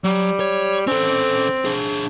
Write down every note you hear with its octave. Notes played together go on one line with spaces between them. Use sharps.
F#3 G3
C#5
C4 C#4 A4
D4 G#4